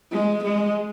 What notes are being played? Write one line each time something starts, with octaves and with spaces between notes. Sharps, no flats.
G#3
G#3